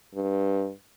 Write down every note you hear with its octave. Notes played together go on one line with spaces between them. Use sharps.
G2